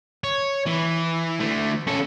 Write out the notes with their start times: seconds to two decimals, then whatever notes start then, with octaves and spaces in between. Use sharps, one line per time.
0.24 C#5
0.66 E3
1.40 D3 A3
1.87 C#4 A4